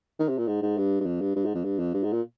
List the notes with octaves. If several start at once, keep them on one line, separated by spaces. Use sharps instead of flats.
D#3
C3
A#2
G#2
G#2
G2
G2
F2
G2
G2
G#2
F2
G2
F2
G2
G#2
A#2